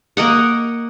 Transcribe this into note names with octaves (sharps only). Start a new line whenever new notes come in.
A#3 A#4 D#5 F#5